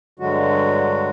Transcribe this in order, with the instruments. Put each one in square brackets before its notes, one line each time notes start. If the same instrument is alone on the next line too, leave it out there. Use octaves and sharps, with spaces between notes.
[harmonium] G2 D3 F#3 G#3 F#4